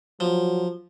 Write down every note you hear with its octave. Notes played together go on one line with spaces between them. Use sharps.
F3 F#3